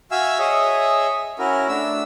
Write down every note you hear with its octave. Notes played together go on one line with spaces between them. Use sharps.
F#4 E5 F5 G#5 E6
G#4 C#5 D#5 E5
C#4 E4 F#4 A#4
A3 D4 E6